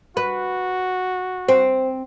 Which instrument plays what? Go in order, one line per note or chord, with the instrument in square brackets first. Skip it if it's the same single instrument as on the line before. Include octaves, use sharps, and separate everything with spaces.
[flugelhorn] F#4 [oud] B4
[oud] C4 [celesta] C5